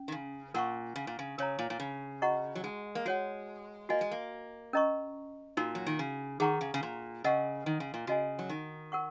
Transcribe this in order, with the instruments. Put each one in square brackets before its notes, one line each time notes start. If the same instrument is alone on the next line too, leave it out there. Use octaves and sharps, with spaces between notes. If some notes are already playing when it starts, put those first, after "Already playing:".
Already playing: [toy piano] C#4
[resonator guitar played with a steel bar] D#3
C#3
[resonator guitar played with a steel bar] A#2 [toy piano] A#4 F#5 C#6
[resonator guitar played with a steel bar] C#3
A#2
C#3
[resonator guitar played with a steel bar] C#3 [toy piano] A#4 C#5 A#5
[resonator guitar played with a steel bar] A#2
A#2
C#3
[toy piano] F#4 D#5 F#5 A#5 C#6
[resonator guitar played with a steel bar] F#3
G#3
A#3
[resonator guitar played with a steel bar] G#3 [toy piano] F#4 C#5 F#5
[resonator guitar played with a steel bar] A#3 [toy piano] F#4 D#5 G#5
[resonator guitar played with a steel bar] G#3
A#3
[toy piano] C#4 A#4 D#5 A#5 C#6
[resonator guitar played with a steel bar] A#2 [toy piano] D#4 F#4 A#4
[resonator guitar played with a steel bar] F#3
D#3
C#3
[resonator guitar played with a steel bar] D#3 [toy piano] G#4 F#5 A#5 C#6
[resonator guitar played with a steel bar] C#3
C#3
A#2
[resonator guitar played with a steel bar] C#3 [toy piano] A#4 D#5 F#5 C#6
[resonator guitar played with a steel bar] D#3
C#3
A#2
[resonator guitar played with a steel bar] C#3 [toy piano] F#4 D#5 G#5
[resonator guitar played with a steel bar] F#3
D#3
[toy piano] A#4 F#5 C#6